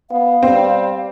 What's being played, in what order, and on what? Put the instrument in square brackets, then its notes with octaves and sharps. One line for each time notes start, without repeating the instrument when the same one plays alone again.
[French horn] B3 [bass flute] F5
[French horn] G3 [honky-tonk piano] C4